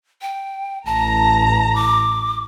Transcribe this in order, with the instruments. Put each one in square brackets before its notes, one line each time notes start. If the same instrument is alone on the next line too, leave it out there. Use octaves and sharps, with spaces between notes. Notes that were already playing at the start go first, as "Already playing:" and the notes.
[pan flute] G5
[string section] A1 A#5 [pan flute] A5
[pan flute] D6